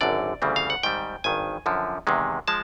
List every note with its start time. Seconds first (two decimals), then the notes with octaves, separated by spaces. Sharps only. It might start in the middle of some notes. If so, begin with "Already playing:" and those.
0.01 G#1 F#2 D3 D5
0.42 D2 C#3 E3 G3 C4
0.56 F5
0.70 F#5
0.83 G#2 D#3 G3 C4 G5
1.24 G#1 G2 D#3 G#5
1.66 F#2 D3 F3
2.07 E2 C3 D#3 G#3
2.48 F3 G#3 A5